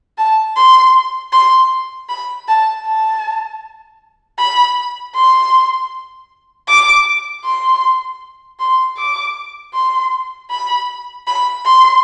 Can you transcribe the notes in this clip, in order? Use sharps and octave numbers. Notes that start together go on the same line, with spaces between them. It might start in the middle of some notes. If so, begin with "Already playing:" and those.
A5
C6
C6
B5
A5
A5
B5
C6
D6
C6
C6
D6
C6
B5
B5
C6